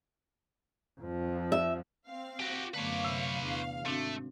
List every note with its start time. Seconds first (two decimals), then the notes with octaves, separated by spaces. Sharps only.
1.00 F2 F3
1.52 E5
2.08 C4 F5
2.40 F#4 G4
2.74 F#2 D3 A3 B3 B4 C#5 F5 D6
3.05 C3 E5
3.43 E2 D4 F5
3.86 G#1 A3 C4 D4 F#4